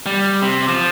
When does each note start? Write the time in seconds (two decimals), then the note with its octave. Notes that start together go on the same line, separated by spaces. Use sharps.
0.06 G3
0.42 C3
0.69 F3